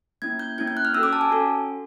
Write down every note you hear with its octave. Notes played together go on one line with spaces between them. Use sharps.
A#3 C#4 E4 G#6
G6
A#3 C#4 E4 G#6
G6
F#6
F6
C#4 F#4 A4 E6
D6
A5
G#5
C#4 F#4 A4